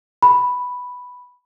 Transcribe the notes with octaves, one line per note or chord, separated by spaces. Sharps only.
B5